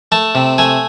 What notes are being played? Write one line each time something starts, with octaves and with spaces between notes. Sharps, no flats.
A3 A5
C3
A3 G#5